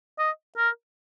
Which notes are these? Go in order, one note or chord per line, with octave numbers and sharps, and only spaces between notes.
D#5
A#4